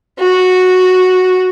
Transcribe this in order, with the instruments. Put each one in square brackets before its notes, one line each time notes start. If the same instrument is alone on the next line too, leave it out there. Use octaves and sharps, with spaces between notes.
[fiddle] F#4